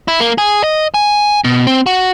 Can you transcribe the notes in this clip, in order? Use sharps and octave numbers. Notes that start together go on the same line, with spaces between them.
E4
A#3
G#4
D#5
G#5
B2
C4
F#4